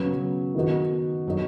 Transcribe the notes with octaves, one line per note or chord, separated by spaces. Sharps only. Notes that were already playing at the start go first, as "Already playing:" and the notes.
Already playing: C#3 F#3 B3
D#3 B3 D#4 F#4
F#3 D#4